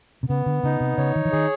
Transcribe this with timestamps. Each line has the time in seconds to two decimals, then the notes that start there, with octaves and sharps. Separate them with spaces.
0.23 C3
0.29 C#3 B3
0.46 D3
0.63 C#3 D#4
0.80 C3
0.98 C#3 C#5
1.15 D#3
1.25 E3
1.32 D#3 G#4